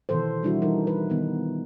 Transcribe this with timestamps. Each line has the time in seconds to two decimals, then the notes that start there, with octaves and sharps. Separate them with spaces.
0.09 B2 D#3 E3 A4 C5
0.43 G3 D4 E4 F#4
0.62 E3 G3 D#4 A#4
0.87 B4
1.10 D#3 B3 D#4